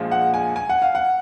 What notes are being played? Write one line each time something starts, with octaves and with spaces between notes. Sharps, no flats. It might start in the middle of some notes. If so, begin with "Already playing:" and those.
Already playing: A#1 A#2 F3 G#3
F#5
G#5
G#5
F#5
F5
F#5